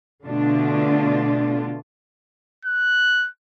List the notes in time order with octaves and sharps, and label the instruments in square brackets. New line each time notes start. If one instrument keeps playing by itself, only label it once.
[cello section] B2 D3 A3 D4 F4
[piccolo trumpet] F#6